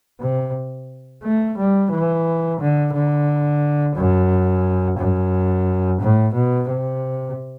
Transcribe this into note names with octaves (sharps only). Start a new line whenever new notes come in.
C3
A3
G3
E3
D3
D3
F#2
F#2
A2
B2
C3